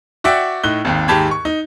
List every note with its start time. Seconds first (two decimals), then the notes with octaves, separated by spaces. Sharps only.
0.24 F#4 D5 E5 F#5 G5
0.64 A2 D#4 F#6 G7
0.85 G#1 D#2
1.08 D#2 G#2 G4 A5 B5 G#6
1.31 C#6
1.45 D#4